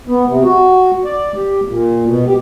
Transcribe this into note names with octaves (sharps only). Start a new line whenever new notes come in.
B3
C3
F#4
D5
G4
A#2
B2
G4